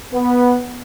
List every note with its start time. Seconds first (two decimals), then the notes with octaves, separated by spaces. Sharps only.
0.12 B3